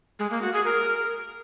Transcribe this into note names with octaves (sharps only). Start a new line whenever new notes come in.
G#3
A#3
F#4
G#4
A#4